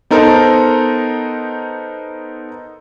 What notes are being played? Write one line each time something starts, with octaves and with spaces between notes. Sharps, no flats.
B3 D#4 A4 A#4 C5